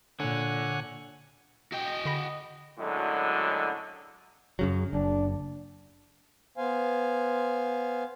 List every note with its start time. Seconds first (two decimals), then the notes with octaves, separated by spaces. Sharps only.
0.20 A#2 D3 C#5 F#5 G#5
1.72 F#4 D#5 G5
2.05 D3 B5 A#6
2.79 F#2 A2 D3 F#3 G#3
4.59 F#2 C#3 F#3
4.93 F#1 D4
6.57 B3 C5 F5 G#5